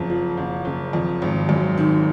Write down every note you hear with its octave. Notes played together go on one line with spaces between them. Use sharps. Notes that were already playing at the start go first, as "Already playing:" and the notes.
Already playing: F#1 F2
F3
F#1
F#1
F2
G#1
F#2
D#3